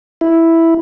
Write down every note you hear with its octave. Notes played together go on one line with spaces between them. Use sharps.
E4